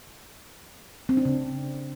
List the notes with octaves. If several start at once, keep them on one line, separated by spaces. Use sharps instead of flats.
C4
D4
C#3